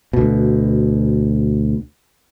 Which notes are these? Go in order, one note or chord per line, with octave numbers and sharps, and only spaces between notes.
D2 B2